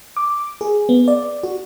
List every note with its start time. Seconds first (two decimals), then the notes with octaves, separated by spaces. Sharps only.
0.17 D6
0.61 G#4
0.89 B3
1.08 D5
1.43 F#4